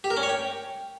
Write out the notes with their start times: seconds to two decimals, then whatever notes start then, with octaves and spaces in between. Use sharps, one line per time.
0.04 G4
0.10 A#4
0.17 C#4
0.23 C#5
0.29 G5